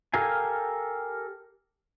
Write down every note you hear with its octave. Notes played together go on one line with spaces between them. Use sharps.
G4 A4 A#4 F5 G#5